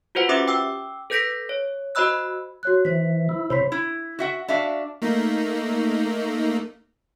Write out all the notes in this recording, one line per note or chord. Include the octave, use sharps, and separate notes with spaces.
F4 F#4 B4 C5 F#5
C#4 G4 E5 D6 D#6
G5 D6 E6
A4 B4 G6 A#6 B6 D7
C#5
F#4 C5 D#5 B5 E6 F#6
F#4 C#5 F#6
E3 C5 B6
E4
C3 C5 C#5 B5 B6
E4
F#4 E5 F#5
D4 F#4 E5 F5
A3 A#3 D#4